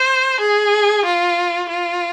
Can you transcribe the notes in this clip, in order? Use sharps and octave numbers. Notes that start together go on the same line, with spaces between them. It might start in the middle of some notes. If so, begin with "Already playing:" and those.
Already playing: C5
G#4
F4
F4